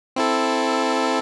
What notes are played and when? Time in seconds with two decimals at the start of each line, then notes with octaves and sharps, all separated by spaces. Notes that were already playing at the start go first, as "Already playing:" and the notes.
0.16 C4 E4 A4